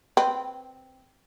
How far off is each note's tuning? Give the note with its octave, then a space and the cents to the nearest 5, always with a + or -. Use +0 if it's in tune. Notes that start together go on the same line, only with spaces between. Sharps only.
C4 +0 B4 +0 G5 -20